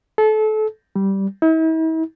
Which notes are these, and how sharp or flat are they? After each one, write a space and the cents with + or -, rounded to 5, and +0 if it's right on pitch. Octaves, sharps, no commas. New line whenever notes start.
A4 -30
G3 -10
E4 -45